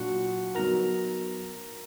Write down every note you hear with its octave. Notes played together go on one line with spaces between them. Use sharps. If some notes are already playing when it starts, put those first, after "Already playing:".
Already playing: A#2 F#3 D4 F4 F#4 F#5
F#3 B3 D#4 F#4 A#4 A#5